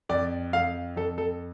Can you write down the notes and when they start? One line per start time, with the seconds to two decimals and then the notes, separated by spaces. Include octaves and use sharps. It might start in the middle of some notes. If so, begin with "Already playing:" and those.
0.09 F2 D5
0.53 F2 F5
0.96 F2 A4
1.18 A4